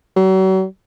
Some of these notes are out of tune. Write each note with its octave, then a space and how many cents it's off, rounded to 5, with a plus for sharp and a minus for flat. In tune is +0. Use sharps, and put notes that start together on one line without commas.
F#3 +40